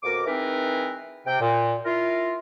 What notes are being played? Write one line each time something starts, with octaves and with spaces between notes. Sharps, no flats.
F2 B2 A#4 D6
E3 G#3 C4 D#4 A#4 B4
C3 G5
A#2
E4 F4 A#4